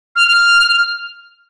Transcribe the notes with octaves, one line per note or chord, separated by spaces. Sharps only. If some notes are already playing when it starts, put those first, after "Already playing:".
F6
F6